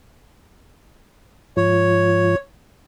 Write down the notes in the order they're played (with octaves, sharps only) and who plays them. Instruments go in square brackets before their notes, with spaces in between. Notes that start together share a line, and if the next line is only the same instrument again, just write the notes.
[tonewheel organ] G#2 F3 F4 [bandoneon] C#5